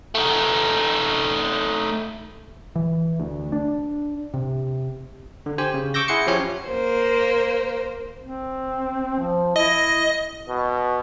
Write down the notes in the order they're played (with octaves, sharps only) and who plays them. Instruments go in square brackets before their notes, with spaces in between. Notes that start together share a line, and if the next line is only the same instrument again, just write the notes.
[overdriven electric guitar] A3 D#4
[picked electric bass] E3
D2
D4
C3
[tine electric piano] D3
G4 C5 G#5
C#3
C#6 D6 E6 G6 A#6
E4 G#4 F#5 C6 C#7
F3 C#4 G4 C#5
[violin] A#3 C5
[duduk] C4
F3
[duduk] E4 [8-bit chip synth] D#5
[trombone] B2